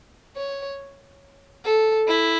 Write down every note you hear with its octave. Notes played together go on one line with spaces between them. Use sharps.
C#5
A4
E4